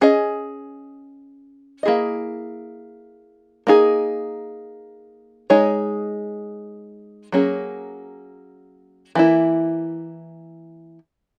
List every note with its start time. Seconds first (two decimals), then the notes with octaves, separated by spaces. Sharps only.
0.01 C#4 G#4 D#5
1.83 A#3 E4 G#4 D#5
3.67 A#3 D#4 G#4
5.50 G#3 D#4 G#4 C#5
7.32 F#3 A#3 C#4 G#4
9.15 E3 A#3 E4